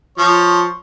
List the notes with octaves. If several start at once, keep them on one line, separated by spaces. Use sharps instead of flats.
F3 C#5